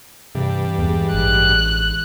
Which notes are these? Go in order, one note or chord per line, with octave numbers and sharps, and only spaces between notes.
G2 C3 E3
E2 G3 G#3
A1 F#6